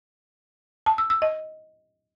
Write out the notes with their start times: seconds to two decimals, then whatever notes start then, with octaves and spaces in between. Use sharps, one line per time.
0.86 A5
0.98 E6
1.10 E6
1.22 D#5